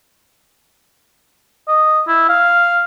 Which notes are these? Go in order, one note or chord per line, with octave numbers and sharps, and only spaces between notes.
D#5
E4
F5